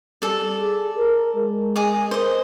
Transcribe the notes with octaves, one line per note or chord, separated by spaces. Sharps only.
G3 A4 D5
G#4
A#4
G#3
G#4 D#5 D6
A#4 C5 D#5